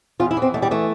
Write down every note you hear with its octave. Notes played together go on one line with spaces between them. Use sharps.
E2 F4
E4
E3
C4
E2 A3
G3
E3 A3